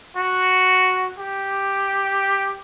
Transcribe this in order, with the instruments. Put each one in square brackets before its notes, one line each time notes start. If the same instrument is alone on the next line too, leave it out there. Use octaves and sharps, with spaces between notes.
[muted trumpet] F#4
G4